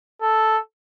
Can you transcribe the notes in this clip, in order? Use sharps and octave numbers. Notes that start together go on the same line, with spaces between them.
A4